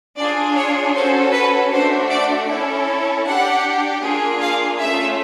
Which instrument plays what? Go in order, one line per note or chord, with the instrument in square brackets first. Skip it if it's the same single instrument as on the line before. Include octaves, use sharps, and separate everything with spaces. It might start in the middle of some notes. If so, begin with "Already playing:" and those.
[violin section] D4 F4 G#4 D5
C#5
C#4 F#4 A4 C5
B4
A3 D4 F#4 C5
D5
C#4 E4 A4
D4 G4 F#5
A#3 D4 F4 G#4
F5
A3 C#4 F4 E5